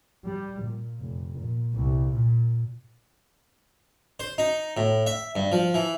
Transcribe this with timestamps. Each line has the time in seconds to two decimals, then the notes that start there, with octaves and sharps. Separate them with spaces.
0.25 G3
0.62 A#2
1.00 F1
1.37 A#2
1.76 C2
2.14 A#2
4.20 C5
4.38 D#4
4.77 A2
5.07 E5
5.36 G2
5.52 F3
5.74 E3